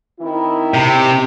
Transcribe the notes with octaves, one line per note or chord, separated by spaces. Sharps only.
D#3 C4 E4
C3